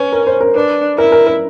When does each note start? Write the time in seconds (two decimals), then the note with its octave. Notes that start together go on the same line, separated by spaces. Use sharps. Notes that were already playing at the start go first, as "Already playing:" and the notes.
Already playing: C#4 B4
0.13 A#4
0.27 C5
0.41 A#4
0.55 D4 B4
0.98 E4 A#4
1.12 A#4
1.27 A#4